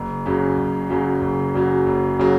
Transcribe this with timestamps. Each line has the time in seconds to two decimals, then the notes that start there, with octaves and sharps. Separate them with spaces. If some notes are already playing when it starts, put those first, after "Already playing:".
Already playing: F#1
0.26 F#2 C#3 F#3
0.57 F#1
0.89 F#2 C#3 F#3
1.21 F#1
1.54 F#2 C#3 F#3
1.86 F#1
2.19 C#3 F#3